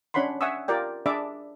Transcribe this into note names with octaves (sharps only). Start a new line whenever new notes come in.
C#4 D4 C#5 F#5 B5 C6
E5 F#5 G#5 C#6 D#6 E6
F4 G4 A#4 D5 G5
D4 G#4 D5 E5 B5 D6